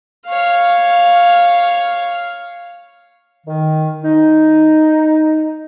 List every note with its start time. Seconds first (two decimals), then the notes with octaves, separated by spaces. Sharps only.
0.26 C#5 F5
3.46 D#3
4.03 D#4